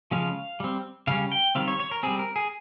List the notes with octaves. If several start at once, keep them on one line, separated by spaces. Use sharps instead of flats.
C#3 F3 G#3 C#4 F5
G3 C4
C#3 G3 C#4 F5
G5
D#3 G3 C4 F5
C#5
C#5
A#4
G3 C4 G#4
A#4
G#4